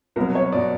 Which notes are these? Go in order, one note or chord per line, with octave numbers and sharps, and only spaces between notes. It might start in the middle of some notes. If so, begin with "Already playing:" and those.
C2 B2 F#3 A#4
C#5
B2 F#3 D5